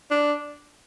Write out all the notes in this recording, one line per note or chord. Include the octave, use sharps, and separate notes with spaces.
D4